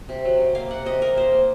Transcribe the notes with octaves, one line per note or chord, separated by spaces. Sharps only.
C3
F#3
C3
A#3 F5
C3 F#5
C3 D#5
C3 A#4
A#3 C5
A#3